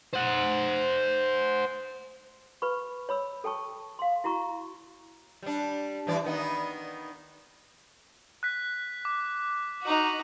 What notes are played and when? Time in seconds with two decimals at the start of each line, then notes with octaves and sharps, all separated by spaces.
0.14 C5 F#5
2.62 B4 B5 C#6
3.09 C#5 B5 E6
3.44 A4 G5 A5 C#6
3.99 F5 C6
4.24 E4 F#4 A#5 C#6
5.43 G3 D4
6.07 G2 E3 D5
6.24 D#3 B3 D#4
8.43 F#6 B6
9.05 D6
9.82 D#4 F#4